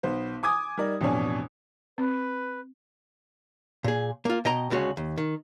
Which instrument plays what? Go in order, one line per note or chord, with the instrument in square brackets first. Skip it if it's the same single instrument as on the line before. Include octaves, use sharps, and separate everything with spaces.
[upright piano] B1 B3 C5
G#5 D6 D#6 G#6
G3 D#4 A#4 D5
A1 F2 B2 D4 C#5 G#5
[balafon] C4 [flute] B4
[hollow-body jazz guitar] A#2 G#4
A#3 F4
B2 D#5 G5 A#5
D2 C#3 G#3 F#4 C#5
D#2
D#3